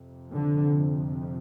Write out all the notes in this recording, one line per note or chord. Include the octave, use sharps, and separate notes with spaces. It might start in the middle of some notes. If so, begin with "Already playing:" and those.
Already playing: F2 C3
D3